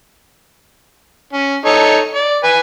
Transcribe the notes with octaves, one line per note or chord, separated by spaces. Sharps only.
C#4
D#4 A4 C#5
D5
B4 G#5